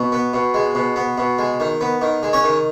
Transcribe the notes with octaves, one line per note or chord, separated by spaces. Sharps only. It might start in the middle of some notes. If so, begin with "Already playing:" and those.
Already playing: B2
B3
B2
G#3
B2
B3
B2
G#3
D#3
B3
D#3
G#3
C#4 C#5
D#3